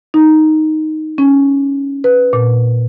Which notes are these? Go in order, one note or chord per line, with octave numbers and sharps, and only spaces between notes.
D#4
C#4
B4
A#2